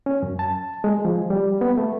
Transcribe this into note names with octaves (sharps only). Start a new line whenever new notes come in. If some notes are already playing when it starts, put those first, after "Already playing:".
C#4
F#2
A5
G#3
F3
G3
B3
A3